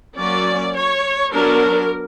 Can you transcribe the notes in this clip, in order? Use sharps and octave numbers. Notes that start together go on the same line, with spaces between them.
F#3 A#3 C#4 D5
C#5
F#3 B3 D4 A#4